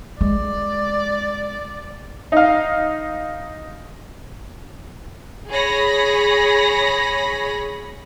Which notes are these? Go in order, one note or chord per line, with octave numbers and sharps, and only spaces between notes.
G#3 D5
D#4 F5
G#4 C#5 B5 A#6